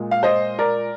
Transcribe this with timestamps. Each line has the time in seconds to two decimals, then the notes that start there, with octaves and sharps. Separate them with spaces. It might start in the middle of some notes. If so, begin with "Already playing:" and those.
Already playing: A#2 G#3
0.11 F5
0.23 C5 D#5
0.59 A#4 D5